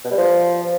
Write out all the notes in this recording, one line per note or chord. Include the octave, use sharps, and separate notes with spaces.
B2
G3
F3